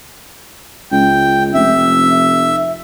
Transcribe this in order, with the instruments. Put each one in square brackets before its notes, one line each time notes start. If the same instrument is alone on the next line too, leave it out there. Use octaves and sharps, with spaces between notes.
[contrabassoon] C#2 [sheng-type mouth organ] G5
[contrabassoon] F1 [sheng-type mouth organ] E5